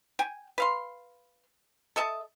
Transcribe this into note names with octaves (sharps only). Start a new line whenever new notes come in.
G5 G#5
B4 F5 C6
A4 D#5 E5 A5